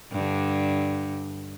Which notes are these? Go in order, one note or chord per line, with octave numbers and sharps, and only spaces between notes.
G2 D3